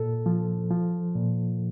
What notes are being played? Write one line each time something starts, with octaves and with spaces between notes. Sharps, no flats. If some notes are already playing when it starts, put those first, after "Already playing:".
Already playing: A#2 A4
F3
F3
A#2